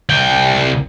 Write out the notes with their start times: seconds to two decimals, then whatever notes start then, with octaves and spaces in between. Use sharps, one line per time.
0.10 C2 G5